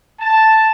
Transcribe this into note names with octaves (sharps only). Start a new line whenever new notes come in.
A5